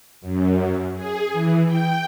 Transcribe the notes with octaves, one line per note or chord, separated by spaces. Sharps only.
F#2
G#4
E3
G5